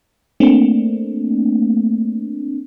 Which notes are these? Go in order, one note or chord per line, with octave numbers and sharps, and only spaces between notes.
A3 A#3 C4 D4